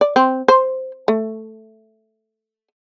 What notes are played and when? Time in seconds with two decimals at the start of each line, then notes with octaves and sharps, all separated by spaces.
0.01 D5
0.16 C4
0.48 C5
1.08 A3